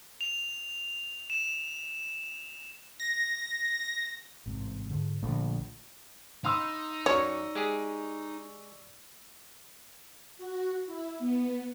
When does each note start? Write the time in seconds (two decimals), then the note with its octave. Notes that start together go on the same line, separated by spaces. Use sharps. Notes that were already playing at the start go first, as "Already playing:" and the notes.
0.21 F7
1.30 E7
3.00 A#6
4.46 A1 G#2 C3
4.90 G#2 D3
5.23 A#1 D3 F3 A3
6.45 D#4 F5 B5 C6 E6
7.06 F#2 F#4 C#5 D5 C#6
7.55 G#3 G4 G#4
10.38 F#4
10.87 E4
11.19 B3